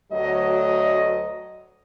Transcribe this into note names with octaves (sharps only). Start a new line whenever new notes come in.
D2 F#3 D#5